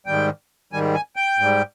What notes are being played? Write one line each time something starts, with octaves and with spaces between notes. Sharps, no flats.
G#2 D#3 G3 G5
G#2 D#3 G3 G#5
G#5
G5
G#2 G3